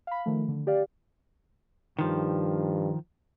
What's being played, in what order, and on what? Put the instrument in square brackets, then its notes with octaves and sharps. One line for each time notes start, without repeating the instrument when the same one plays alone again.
[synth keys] F5 B5
D#3 F3 A3
D3
G4 D5 F5
[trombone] G2 [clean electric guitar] D#3 F3